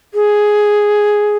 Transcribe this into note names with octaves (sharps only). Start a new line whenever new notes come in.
G#4